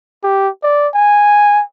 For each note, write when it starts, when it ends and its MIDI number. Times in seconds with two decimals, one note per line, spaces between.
0.24 0.49 67
0.63 0.88 74
0.94 1.63 80